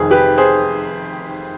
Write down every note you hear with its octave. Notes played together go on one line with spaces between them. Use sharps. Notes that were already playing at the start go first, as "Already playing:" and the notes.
Already playing: F1 F2 D#3 G#4
G4 B4
G#4 C5